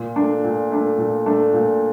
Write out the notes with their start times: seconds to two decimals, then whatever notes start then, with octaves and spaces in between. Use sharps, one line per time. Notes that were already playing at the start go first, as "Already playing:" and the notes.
Already playing: A#2
0.16 A3 D4
0.44 A#2
0.71 A3 D4
0.98 A#2
1.26 A3 D4
1.54 A#2